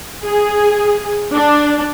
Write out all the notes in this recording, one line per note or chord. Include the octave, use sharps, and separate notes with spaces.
G#4
D4